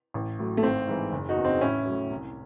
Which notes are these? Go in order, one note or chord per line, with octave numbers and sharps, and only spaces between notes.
A1
A2 F#3
A3
G#1 C4
G#2 E3
F#1
D#4 F#4
E2 C#3
C4 D#4
A1 C#4 E4
A2 F#3
C2